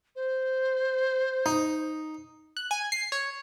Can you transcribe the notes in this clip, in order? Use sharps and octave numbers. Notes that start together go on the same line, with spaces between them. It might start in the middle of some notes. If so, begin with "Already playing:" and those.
C5
D#4
F#6
G#5
C7
C#5